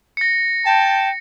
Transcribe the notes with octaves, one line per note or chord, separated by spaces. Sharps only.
A#6 C#7
G5 A5